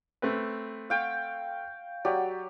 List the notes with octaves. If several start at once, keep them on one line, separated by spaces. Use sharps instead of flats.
A3 C4 B4
F5 G5 C#6
F#3 G4 D5